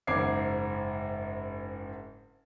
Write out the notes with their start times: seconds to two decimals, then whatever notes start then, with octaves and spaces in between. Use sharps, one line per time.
0.07 F#1 G#2 C4 D6 G#6 C7